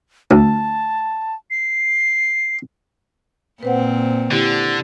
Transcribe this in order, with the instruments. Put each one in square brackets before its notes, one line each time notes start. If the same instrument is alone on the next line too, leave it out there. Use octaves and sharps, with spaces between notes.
[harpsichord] D2 [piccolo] A5
[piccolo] C7
[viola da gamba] A#2 C4 [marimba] B4 C5 F#5
[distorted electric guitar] D3 [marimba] E4 G4